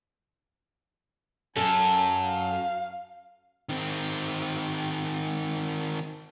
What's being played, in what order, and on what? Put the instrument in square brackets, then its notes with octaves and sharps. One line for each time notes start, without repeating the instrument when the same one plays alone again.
[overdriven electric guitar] F#2 [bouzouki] A4 [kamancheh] G#5
[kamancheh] F5
[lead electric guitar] D#3 C4